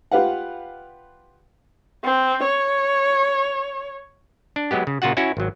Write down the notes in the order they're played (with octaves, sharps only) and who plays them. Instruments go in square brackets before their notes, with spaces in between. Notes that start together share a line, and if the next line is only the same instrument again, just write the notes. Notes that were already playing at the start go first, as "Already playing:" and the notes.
[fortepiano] F4 G4 B4 F5 F#5
[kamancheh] C4
C#5
[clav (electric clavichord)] D4
F#3 G#3 B3 G4
C#3
A#2 C#3 F4 F#4 F#5
C#4 E4 F#4
G#1 F#3